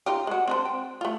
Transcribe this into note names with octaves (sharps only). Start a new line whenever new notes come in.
D#4 F4 G4
G#3 F#4
C4 D4 C5
G5
A3 F4